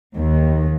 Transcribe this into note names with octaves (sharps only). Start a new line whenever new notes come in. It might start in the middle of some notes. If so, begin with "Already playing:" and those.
D#2